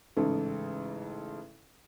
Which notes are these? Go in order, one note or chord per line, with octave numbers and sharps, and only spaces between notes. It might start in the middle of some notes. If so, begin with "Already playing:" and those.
A1 G#2 C#3 A4